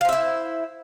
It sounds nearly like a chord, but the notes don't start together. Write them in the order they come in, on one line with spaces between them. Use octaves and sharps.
F5 C5 E5 E4